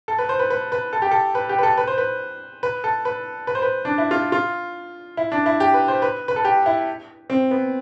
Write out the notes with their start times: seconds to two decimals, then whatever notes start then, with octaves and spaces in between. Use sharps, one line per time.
0.08 A4
0.19 B4
0.29 C5
0.39 B4
0.50 B4
0.72 B4
0.93 A4
1.02 G4
1.11 A4
1.35 B4
1.49 G4
1.58 B4
1.63 A4
1.77 B4
1.87 C5
1.98 B4
2.63 B4
2.84 A4
3.05 B4
3.47 B4
3.55 C5
3.62 B4
3.85 D4
3.98 E4
4.11 F4
4.32 F4
5.17 E4
5.32 D4
5.46 E4
5.60 G4
5.74 B4
5.88 C5
6.02 B4
6.28 B4
6.36 A4
6.45 G4
6.66 E4
7.30 C4
7.51 B3